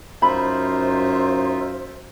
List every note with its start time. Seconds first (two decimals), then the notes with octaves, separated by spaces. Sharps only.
0.22 F#2 D#4 F4 C5 E5 B5